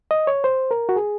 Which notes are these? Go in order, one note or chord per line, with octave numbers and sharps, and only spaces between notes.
D#5
C#5
C5
A#4
F#4
G#4